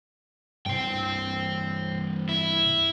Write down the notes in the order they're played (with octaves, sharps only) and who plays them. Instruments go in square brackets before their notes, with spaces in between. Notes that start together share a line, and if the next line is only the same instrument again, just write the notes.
[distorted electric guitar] C2 G2 [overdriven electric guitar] C5 G5
[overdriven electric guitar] E4